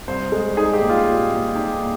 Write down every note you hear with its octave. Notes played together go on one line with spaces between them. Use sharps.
C2 C5
G#3
D#4 G#4
G4
A#2
F4
A#2
A#2
D#4 G4
A#2